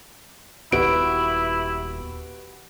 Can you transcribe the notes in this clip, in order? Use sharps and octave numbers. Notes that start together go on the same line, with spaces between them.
D#1 F#2 B3 E4 F#4 G4 B4 D7